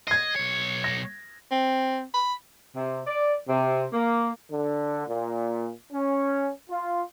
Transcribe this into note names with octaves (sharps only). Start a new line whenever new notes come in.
D#5 G#6 C7
B1 C#5
A#6
C4
B5
C3
D5
C3
A#3
D3
A#2
C#4
F4